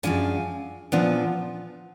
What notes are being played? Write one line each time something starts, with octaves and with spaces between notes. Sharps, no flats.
F#2 F3 G#3 D4 F5 G#5
A#2 F3 B3 D4